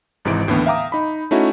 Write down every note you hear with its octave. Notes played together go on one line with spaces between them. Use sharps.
G#1 G#2 C3 E3 D#4 D7
D#2 A2 D3 E3 B3
E5 F5 G5 A#5 D6 D#6
D#4 B5
A3 C#4 D#4 E4 F#4